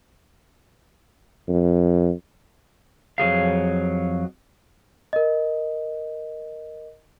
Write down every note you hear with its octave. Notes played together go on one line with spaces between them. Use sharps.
F2
F2 F#3 G#4 F5
A#4 D#5